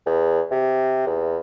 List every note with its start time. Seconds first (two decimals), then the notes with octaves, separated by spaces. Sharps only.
0.06 E2
0.51 C3
1.07 E2